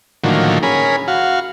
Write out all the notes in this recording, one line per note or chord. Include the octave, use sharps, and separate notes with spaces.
A2 D3 D#3 F3 F#3 A#3
C#4 G#4 A#4 B5
F#4 F5